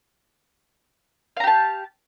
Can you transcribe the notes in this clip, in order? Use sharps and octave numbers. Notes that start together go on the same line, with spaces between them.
G4 F5 A5 A#5